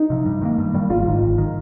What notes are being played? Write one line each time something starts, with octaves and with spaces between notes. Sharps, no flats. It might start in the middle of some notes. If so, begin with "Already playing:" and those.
Already playing: D#4
C3 F3
G2
D#3 G3 A#3
G2
D#3 G3 A#3
G#1 F4
G#2 D#3
G#1
D#3